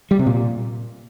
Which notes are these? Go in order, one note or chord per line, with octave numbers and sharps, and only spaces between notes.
G3
C3
A#2